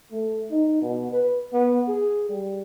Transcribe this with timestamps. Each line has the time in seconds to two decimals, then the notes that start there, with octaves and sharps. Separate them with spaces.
0.11 A3
0.51 D#4
0.81 B2
1.12 B4
1.53 B3
1.88 G#4
2.29 G3